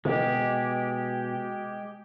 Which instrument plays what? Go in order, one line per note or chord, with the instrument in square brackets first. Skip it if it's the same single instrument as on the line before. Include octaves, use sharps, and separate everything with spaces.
[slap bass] B2 [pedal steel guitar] G#3 G4